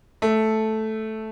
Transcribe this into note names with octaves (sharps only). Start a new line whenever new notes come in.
A3